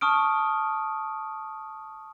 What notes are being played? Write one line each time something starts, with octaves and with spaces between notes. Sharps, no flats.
A5 C#6 D#6 F6 D7